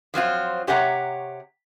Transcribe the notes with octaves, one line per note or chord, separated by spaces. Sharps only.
F3 F#3 C4 F4
C3 G4 C#5 F#5 A#5